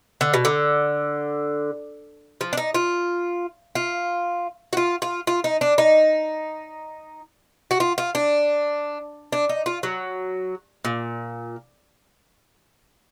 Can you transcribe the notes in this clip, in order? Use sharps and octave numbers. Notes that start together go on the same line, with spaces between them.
D3
B2
D3
F3
D4
D#4
F4
F4
F#4
F4
F4
F4
D#4
D4
D#4
F#4
F4
F4
D4
D4
D#4
F4
F#3
A#2